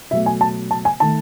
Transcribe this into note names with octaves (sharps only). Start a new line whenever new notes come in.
B2 F#3 A3 E5
G#5
A5
A5
G#5
D#3 A3 A5